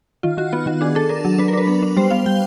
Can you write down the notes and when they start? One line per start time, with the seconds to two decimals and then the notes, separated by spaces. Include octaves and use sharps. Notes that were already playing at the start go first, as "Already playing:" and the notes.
0.23 D#3 F4
0.37 D#3 F#4
0.53 B3 F4
0.66 D#3 F#4
0.81 D4 G#4
0.95 D4 A4
1.09 D4 A#4
1.25 F#3
1.39 D4 B4
1.48 A#4
1.53 D4 B4
1.67 B3
1.82 D4
1.97 G3 C5
2.10 B3 F5
2.26 G3 G5